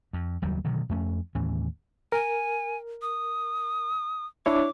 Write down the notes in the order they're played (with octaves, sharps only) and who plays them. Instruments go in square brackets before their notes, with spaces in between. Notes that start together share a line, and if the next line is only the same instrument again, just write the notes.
[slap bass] F2
F#1 D#2 F#3 G3
B2 D3 D#3 F#3
F2 A3 C4 C#4
D#2 A2 E3 C#4
[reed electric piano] A#4 [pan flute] G#5
[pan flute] D#6
[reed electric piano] D4 E4 C#5 [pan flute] D6